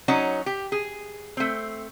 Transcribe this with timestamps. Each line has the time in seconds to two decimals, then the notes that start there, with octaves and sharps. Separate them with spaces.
0.08 F#3 C#4 D#4 F#4
0.46 G4
0.72 G#4
1.37 A3 C4